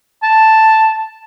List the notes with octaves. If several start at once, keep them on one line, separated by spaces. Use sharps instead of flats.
A5